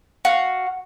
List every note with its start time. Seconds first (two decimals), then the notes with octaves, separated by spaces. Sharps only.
0.25 F#4 F5